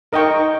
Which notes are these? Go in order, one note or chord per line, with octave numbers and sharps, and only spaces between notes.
D#4 A#4 D#5 G5 C#6